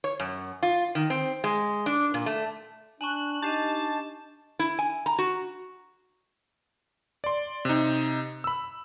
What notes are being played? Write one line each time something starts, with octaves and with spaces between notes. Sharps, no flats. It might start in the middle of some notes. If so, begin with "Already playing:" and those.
C#5
F#2
F4
D#3
C4
G#3
D4
A#2
A3
D4 G#5 A5 C#6 F#6
D4 D#4 G4 D#5 A5 G6 C7
E4
G#5
A#5
F#4
D5 C6
C3 D#4
B5 E6